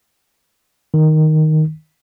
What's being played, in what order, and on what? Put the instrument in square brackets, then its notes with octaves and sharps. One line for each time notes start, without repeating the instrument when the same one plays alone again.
[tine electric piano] D#3